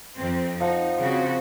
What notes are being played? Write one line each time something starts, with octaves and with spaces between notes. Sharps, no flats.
F2 C4
F3 D#4 F#5
C#3 C4 F#4